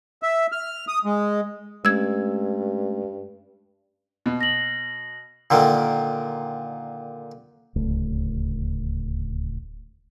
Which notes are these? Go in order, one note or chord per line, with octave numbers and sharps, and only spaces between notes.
E5
F6
D#6
G#3
G2 G#3 A3 C#4 E6 G#6
B2
A#6 F#7
A#2 D3 D#3
D1 C#2 A3